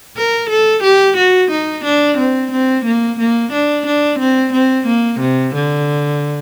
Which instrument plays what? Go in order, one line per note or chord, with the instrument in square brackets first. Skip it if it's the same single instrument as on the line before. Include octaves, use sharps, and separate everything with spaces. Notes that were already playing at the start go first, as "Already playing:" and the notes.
[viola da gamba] A#4
A4
G4
F#4
D#4
D4
C4
C4
A#3
A#3
D4
D4
C4
C4
A#3
C3
D3